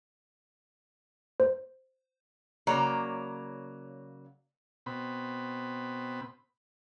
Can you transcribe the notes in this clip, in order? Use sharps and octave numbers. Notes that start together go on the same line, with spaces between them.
C5
C#3 F#3 A#3 C#5 D5
B2 C4 B5